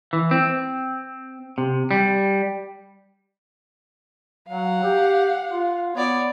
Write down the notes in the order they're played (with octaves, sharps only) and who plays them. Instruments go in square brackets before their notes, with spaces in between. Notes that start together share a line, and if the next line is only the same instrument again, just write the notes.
[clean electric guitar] E3
C4
C3
G3
[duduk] F#3 [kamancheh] F5 F#5
[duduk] G4
F4
[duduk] B3 [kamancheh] C#5 D5